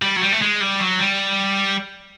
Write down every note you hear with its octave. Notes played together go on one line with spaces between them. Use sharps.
G3
F#3
G3
A3
G#3
G3
F#3
G3